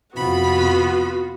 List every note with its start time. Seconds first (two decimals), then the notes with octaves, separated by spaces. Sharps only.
0.15 F2 C3 B3 F4 F#4 B5